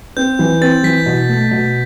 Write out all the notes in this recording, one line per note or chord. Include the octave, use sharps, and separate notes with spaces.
C4 G6
E3
C4 A6
E3 B6
B2
A3
B2